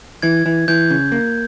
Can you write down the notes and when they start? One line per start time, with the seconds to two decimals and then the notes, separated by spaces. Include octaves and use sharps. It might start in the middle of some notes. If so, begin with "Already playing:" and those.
0.22 E3 G#6
0.46 E3
0.68 E3 G6
0.90 C#3
1.12 A#3